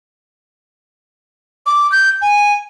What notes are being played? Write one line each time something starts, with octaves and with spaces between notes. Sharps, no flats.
D6
G6
G#5